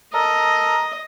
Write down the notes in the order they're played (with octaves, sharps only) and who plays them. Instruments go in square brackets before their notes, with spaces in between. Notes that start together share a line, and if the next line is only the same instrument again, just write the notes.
[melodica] A4 A#4 A#5 [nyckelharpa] D#5